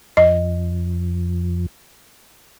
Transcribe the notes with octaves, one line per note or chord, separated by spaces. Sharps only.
F2 D#5